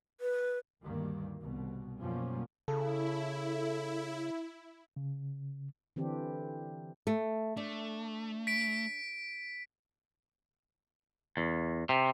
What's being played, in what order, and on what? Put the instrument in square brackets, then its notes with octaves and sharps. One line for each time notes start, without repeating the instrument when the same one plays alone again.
[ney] B4
[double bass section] D2 G2 D#3 A#3
C2 B2
F#2 B2 F3 G3 A#3 C#4
[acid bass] C#3 [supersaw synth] E4 [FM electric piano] A4
[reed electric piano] C#3
[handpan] D3 E3 C4 D4 G4
[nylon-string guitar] A3
[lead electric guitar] A3 [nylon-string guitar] D4
[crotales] B6 D7
[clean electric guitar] E2
C3